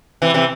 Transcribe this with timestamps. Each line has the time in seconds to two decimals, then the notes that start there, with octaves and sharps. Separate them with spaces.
0.22 C3 E3
0.34 C3 E3